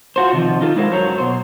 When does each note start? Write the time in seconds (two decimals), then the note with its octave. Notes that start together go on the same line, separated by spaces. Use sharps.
0.16 F4 F#4 C5
0.32 C3 D#3 F3
0.61 D#4 F4 A4
0.76 G#3 E4 A#4 C5 C#5 F5
0.91 F#2 F#3 C5 C#5 A#5
1.18 B2 C5